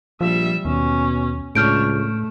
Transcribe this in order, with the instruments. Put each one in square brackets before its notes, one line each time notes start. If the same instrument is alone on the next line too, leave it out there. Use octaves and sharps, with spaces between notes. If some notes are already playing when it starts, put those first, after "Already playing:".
[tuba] A#1 [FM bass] F3 [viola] G3 E5
[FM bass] D#2 [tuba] B2 [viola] C#4
[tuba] C#2 [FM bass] A2 [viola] D4 C#5 [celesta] F6 G6 D7
[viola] A3